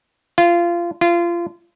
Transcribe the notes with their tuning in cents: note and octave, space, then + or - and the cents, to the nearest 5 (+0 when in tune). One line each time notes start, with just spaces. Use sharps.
F4 -20
F4 -25